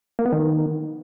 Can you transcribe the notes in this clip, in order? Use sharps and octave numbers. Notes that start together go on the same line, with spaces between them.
A#3
B3
D#3